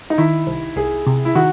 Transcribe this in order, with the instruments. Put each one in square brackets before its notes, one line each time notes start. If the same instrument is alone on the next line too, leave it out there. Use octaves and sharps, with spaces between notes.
[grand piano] D#4
[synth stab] D#3 [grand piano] E4
[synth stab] C2
[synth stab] C2 [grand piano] G#4
[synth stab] C3
[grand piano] E4
[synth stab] D#3 [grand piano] F#4